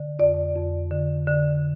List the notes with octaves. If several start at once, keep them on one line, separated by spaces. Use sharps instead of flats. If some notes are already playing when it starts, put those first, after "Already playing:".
Already playing: D3
F2 D5
F2
D3
D3